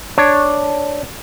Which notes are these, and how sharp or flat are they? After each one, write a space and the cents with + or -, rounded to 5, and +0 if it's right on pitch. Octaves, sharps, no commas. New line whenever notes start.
D4 +0 C#5 +0